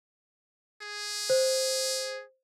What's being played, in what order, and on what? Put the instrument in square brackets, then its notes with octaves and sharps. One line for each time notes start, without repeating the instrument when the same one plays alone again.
[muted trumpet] G#4
[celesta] C5